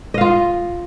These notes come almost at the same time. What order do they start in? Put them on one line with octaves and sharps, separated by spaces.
D#5 F5 F4